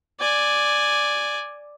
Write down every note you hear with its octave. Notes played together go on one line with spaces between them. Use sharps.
D5 G#5